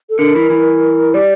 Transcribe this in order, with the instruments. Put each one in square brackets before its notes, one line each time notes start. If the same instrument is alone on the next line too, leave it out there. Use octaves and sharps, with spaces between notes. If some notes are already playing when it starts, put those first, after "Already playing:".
[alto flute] A4
[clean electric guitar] D3 [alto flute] A#4
[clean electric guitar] E3
E3
[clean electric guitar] G3 [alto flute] D5